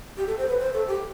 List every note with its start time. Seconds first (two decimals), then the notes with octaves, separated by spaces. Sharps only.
0.17 G4
0.27 A4
0.38 C5
0.48 B4
0.59 C5
0.73 A4
0.87 G4